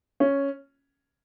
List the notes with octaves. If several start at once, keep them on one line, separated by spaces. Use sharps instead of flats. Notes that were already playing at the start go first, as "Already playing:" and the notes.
C#4